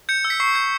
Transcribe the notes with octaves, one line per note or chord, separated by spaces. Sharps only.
G6 C#7
E6
B6
C#6 C7
G6